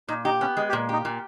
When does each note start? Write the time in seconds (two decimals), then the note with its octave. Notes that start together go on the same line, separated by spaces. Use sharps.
0.08 A#2 D#4
0.25 D#4 G4
0.41 B3 C#4
0.57 G#3 G#4
0.69 G4
0.73 A#2
0.89 D#4 G4
1.05 A#2